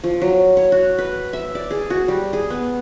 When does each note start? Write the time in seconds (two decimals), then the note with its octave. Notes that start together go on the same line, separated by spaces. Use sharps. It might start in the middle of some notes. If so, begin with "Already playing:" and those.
0.04 F3
0.22 F#3
0.57 C#5
0.72 F#4
0.98 B4
1.33 E5
1.55 D5
1.71 G#4
1.90 F#4
2.08 G3
2.33 G#4
2.50 B3